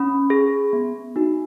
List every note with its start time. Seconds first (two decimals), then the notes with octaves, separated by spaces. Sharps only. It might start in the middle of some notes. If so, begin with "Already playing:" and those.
Already playing: C#4 B5
0.30 G#4
0.73 B3
1.16 D#4 F#4